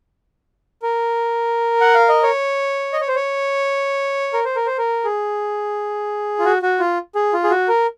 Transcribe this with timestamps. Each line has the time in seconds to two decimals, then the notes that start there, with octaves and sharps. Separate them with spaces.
0.83 A#4
1.81 F#5
1.95 F5
2.09 D#5
2.23 C#5
2.93 D#5
3.01 C#5
3.08 C5
3.15 C#5
4.33 A#4
4.45 C5
4.56 A#4
4.66 C5
4.78 A#4
5.04 G#4
6.39 F4
6.45 F#4
6.62 F#4
6.80 F4
7.15 G#4
7.34 F4
7.44 G#4
7.50 F#4
7.68 A#4